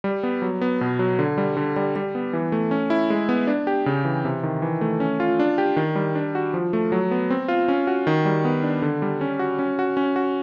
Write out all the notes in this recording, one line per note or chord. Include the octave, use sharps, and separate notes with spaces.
G3
B3
F#3
B3
B2
F#3
D3
G3
D3
G3
G3
B3
E3
A3
C#4
E4
G#3
B3
D4
G4
C#3
E3
C3
D#3
E3
A3
C#4
F4
D4
G4
D#3
G3
D4
F#4
F3
A3
F#3
B3
C4
F4
C#4
F#4
D#3
G3
B3
D4
D3
G3
C#4
F#4
C#4
F#4
C#4
F#4